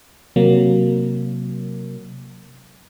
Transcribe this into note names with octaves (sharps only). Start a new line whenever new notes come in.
C3 F#3 A#3